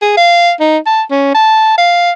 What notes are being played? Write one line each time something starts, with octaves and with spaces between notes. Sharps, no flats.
G#4
F5
D#4
A5
C#4
A5
F5